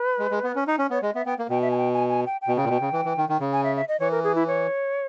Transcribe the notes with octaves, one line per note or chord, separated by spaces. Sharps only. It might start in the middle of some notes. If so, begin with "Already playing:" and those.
Already playing: B4
G#3
G#3
B3
C#4
D#4
C#4
B3 C#5
G#3 D#5
B3 E5
B3 G5
A#3
B2 G5
E5
G#5
G5
G#5
G#5
G5
G5
B2
C#3 G5
A#2
B2
C#3
E3
E3
D#3
D#3
C#3
G#5
E5
E5
D#5
E3 C#5
A#4
G#4
E4
C#5